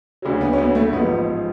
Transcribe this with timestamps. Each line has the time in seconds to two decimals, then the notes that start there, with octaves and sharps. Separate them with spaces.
0.22 D2 C#3 F#3
0.41 B3
0.53 C#4
0.58 B3
0.75 A3
0.93 A1 G#2 F3 B3